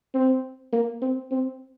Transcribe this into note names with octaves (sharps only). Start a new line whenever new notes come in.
C4
A#3
C4
C4